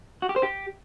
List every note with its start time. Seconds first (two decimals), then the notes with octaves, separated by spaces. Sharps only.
0.22 F#4
0.29 G4
0.36 C5
0.43 G4